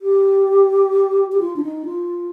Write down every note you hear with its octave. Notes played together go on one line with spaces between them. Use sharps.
G4
G4
F4
D4
D#4
F4